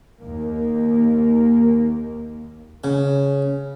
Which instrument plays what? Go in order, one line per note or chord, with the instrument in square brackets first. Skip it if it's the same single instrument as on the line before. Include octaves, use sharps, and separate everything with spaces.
[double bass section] D#2 A#3
[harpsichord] C#3